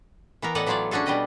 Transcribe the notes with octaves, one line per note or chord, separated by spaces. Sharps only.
E3 B3 A#4
A2 B3 A4 D5 D#5 F#5
E3 F#3 E4 F4 C#5 D5
C#4 D4 F#4 G#4 A4
B2 G3 D4 B4 D#5 G5